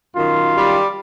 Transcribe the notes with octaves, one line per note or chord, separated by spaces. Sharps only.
F#2 D#3 F4
G3